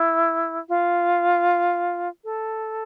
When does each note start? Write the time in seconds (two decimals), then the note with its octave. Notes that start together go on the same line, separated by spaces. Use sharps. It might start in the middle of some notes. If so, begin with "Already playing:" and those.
Already playing: E4
0.69 F4
2.24 A4